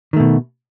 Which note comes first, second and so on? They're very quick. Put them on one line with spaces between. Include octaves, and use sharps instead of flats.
D#3 A3 B2